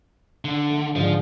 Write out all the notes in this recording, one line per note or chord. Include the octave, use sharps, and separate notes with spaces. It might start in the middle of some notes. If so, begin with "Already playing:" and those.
D3
A3 E7
G#2 D3 F3 G#3